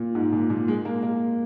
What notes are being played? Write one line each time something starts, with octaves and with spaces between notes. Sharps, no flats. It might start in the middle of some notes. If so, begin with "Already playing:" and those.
Already playing: A#2
G#2
A#2
A#2
G#3
A#3
A#3